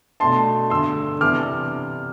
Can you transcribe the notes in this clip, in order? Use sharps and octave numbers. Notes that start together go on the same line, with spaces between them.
B2 A3 D4 A5 C6
G2 D3 A3 C6 E6
C3 E3 B3 D4 D6 F6